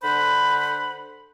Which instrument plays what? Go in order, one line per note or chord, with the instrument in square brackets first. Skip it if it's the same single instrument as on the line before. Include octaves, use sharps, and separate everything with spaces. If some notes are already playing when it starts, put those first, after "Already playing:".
[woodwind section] D3 D4 C5 F#5 B5